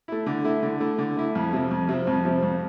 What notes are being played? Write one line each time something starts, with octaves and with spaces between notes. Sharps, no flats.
A3 E4
D3
A3 E4
D3
A3 E4
D3
A3 E4
F2
C3 F3
F2
C3 F3
F2
C3 F3
F2